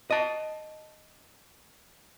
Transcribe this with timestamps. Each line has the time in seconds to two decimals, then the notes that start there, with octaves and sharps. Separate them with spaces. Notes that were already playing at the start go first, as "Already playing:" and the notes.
0.11 D#5 A5